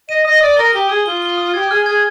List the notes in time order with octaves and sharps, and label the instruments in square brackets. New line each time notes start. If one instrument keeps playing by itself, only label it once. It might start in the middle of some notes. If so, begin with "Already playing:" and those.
[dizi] D#5 [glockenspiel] D#7
[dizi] D#5 [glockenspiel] D#6
[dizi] D5 [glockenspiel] D#6
[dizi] A#4 [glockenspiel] G7
[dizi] G4 [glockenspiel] G7
[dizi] G#4 [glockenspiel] D#6
[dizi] F4 [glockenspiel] G7
[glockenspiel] G7
D#6
[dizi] G4 [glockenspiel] G#6
[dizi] G#4 [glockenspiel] F6
[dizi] G#4 [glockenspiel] G#6